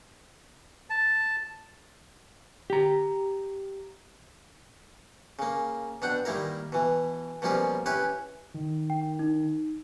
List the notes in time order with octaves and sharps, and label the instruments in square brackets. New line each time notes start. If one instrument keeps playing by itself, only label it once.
[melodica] A5
[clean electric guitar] G4 A#5
[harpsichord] C#3 A#3
B2 D4 F#5 G5
D#3 G3 A#3 E4 A#4
B2 E3
B2 F3 G3 A#3 C#4 F4
C#4 E4 G4 B4 C#5
[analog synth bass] D#3
[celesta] G5
D#4